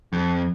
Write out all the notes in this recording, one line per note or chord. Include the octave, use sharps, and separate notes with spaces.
F2